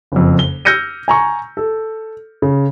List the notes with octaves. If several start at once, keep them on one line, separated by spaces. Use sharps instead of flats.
F#1 F2
G7
E6 F6 G6 A#6 C#7 D#7
G#5 A#5 C#6
A4
C#3